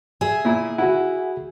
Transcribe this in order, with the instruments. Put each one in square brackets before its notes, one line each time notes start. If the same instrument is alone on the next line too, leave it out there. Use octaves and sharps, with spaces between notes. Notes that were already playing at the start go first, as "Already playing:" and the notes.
[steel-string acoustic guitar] G#4 E5
[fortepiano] A#2 E4
[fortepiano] E4 [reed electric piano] F#4 F#5